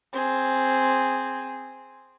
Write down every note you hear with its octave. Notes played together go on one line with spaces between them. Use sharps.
C4 G#4